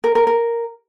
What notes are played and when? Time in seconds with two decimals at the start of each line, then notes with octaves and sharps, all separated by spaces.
0.04 A#4
0.15 A#4
0.27 A#4